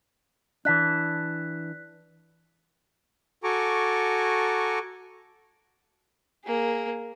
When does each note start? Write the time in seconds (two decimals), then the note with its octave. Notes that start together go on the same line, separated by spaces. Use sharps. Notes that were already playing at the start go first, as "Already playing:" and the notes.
0.65 E3 D4 F#6 B6
3.43 F#4 A4 G#5 A#5 C#6 D6
6.45 A#3 G#4